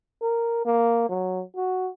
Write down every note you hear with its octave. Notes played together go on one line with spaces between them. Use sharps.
A#4
A#3
F#3
F#4